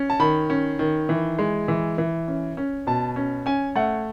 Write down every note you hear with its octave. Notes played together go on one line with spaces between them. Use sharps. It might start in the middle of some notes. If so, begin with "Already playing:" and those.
Already playing: C#4
A5
D#3 B5
C#4
D#3
E3
G#3
E3
E3
C#4
C#4
B2 A5
C#4
C#4 G#5
A3 F#5